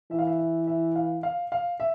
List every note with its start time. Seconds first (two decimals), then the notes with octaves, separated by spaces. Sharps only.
0.11 E3 E5
0.19 F5
0.27 E5
0.39 E5
0.67 E5
0.96 F5
1.23 F5
1.52 F5
1.80 E5